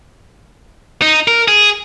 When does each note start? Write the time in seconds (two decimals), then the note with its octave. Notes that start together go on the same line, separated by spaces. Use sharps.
1.02 D#4
1.28 A#4
1.48 G#4